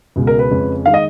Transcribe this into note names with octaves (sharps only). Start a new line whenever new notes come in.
C#2 B2 G#3
A#4
B4
F2 C#3 G#3 C#4
D#3 G#3 F5
D#5